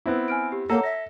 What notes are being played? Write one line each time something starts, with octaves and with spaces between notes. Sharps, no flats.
B3 C4 E4
G#5 F6 D7
G4
A#3 A4 C#5 F#5 A#5
E5 A#6